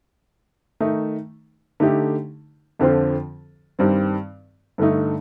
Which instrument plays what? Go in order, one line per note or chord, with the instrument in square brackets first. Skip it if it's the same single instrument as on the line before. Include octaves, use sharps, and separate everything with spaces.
[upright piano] D#3 A3 D#4
D3 A3 D#4 G4
F2 D3 F3 C4 F4
G2 D#3 G3 C4
G2 D3 A3 D#4